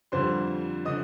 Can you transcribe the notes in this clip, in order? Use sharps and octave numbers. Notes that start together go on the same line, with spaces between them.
F2 D3 G3 C5 C6
D3 D#5 D#6